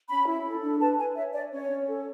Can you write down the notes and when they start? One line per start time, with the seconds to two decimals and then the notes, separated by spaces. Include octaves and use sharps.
0.08 C#4 B5
0.26 E4
0.45 A4
0.62 D4
0.80 B4 A5
0.98 B4 G#5
1.16 C#5 E5
1.34 C#5 D5
1.52 C#4 C#5
1.70 C#4
1.88 A4